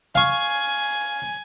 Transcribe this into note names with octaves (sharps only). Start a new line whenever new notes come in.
F5 G#5 C#6